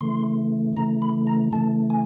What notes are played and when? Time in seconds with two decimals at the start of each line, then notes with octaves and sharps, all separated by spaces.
0.01 C#3 E3 A3 C6
0.76 C#3 E3 A3 A#5
1.02 B5
1.27 A#5
1.52 C#3 E3 A3 A5
1.90 G#5